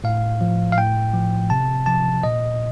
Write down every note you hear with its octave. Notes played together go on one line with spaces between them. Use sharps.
A2 F5
F3
F5
A2 G5
F3
C3 A5
F3 A5
A#2 D#5